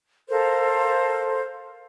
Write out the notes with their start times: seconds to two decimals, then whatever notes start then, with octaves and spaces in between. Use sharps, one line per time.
0.29 A4 A#4 C5 F5